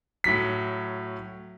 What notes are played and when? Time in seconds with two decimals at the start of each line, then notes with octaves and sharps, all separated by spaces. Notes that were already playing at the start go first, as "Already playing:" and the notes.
0.24 A2 F#3 B6